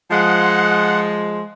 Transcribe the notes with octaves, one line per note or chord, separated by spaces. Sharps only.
F3 G#3 F#5